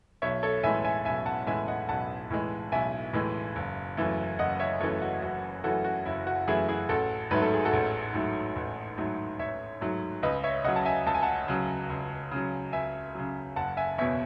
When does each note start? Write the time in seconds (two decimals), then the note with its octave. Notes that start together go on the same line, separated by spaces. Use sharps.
0.22 B1 C#5 E5
0.43 A4 C#5
0.63 A2 E3 G#3 E5 G#5
0.85 E5 G#5
1.05 B1 E5 G#5
1.26 F#5 A5
1.47 A2 E3 G#3 E5 G#5
1.68 D#5 F#5
1.89 B1 F#5 A5
2.30 A2 E3 G#3
2.72 B1 E5 G#5
3.13 A2 E3 G#3
3.56 F#1
3.97 F#2 E3 A3
4.39 F#1 D#5 F#5
4.60 C#5 E5
4.81 F#2 E3 A3 A4 C#5
5.02 F#4
5.22 F#1 F#4
5.64 F#2 E3 A3 F#4 A4
5.85 F#4
6.05 F#1 E4
6.27 F#4
6.47 F#2 E3 A3 E4 G#4
6.68 E4 G#4
6.89 A1 F#4 A4
7.31 G#2 F#3 A3 B4
7.42 A4
7.54 G#4
7.65 F#4 A4
7.73 A1
8.14 G#2 F#3 A3
8.56 A1
8.98 G#2 F#3 A3
9.39 A1 C#5 E5
9.81 G#2 F#3 A3
10.23 C#2 B4 D#5
10.44 C#5 E5
10.64 C#3 F#3 D#5 F#5
10.76 A5
10.85 E5 G#5
11.06 C#2 A5
11.15 G#5
11.22 F#5 A5
11.48 C#3 F#3
11.90 C#2
12.31 C#3 F#3
12.73 C#2 E5 G#5
13.15 C#3 F#3
13.56 F#1 F#5 A5
13.77 E5 G#5
13.98 E2 B2 C#5 E5